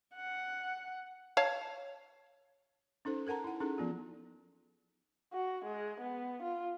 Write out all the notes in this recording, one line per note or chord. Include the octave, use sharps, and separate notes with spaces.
F#5
C#5 F5 A5
C#4 D#4 A4 C5
A4 A#4 F#5 A5 A#5
E4 F#5
C#4 D#4 G#4 A4
F3 B3 F4
F#4
G#3
B3
F4